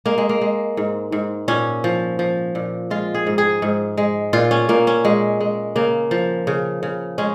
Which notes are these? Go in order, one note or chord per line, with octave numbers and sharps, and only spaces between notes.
G#3 A#3
G#3
A#3
G#3
G#2
G#2
A#2 C#4
F3
F3
A#2
G#3 F4
G#4
G#2
G#4
G#2
G#3
A#2 F4
C#4
A#2 A#3
C#4
A#2 G#3
G#3
C#3 A#3
F3
C#3
C#3
G#3 C#4